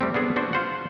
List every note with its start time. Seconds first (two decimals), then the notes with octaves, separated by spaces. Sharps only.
0.01 G3 A3 C4
0.14 B3 D4 G#4 A4
0.36 D4 F#4 C5
0.53 F4 C5 F#5